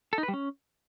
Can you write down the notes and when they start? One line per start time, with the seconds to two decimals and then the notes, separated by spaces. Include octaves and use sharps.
0.13 A4
0.18 D#4
0.23 B4
0.28 G3
0.34 C#4